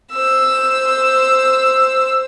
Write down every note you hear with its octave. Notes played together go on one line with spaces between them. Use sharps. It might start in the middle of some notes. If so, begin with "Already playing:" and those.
C5 E6